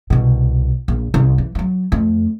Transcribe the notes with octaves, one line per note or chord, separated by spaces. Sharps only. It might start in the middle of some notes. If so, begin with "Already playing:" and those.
C2 B2
A#1
C2
E3
F3 F#3
F2 A3